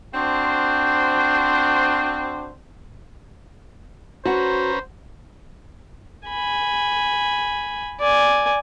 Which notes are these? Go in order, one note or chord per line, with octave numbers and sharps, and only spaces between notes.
C4 D4 F#4 C5
C#4 F#4 B4 C5 A#5
G#5 B5
D5 G#5